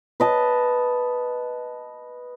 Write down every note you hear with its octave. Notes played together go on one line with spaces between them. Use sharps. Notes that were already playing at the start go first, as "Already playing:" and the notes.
B4 D#5 A5